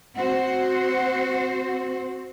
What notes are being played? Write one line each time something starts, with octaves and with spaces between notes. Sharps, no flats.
C4 F#4 C5 F#5